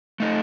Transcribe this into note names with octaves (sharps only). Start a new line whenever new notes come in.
A3 D#4 A4 D#5